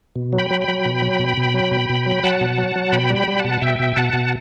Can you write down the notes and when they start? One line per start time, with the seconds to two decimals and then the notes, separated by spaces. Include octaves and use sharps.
0.16 B2
0.33 F#3
0.38 G5 B5
0.50 F#3
0.61 G5 B5
0.68 F#3
0.86 B2
1.02 F#3
1.19 B2
1.37 B2
1.54 F#3
1.71 B2
1.89 B2
2.06 F#3
2.23 F#3 F#5 A5
2.41 B2
2.58 F#3
2.76 F#3
2.92 B2 G5 B5
3.10 G3
3.15 G5 B5
3.28 G3
3.39 B2 F#5 A5
3.62 B2 E5 G5
3.79 B2
3.96 B2 F#5 A5
4.13 B2